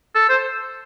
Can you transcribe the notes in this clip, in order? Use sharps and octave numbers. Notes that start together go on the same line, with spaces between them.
A4
C5